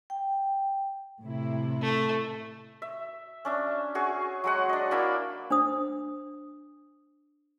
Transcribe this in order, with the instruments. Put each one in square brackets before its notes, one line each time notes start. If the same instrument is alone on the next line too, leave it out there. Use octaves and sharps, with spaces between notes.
[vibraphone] G5
[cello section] A2 C3 E4
[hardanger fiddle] A3
[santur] E5
C#4 D4 E5
F#4 G#4 C#5
F#3 G#3 F#5
D4 D#5
A#3 D4 E4 B5
[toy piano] D4 C5 D#6